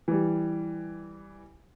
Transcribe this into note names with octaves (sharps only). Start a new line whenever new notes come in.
E3 G3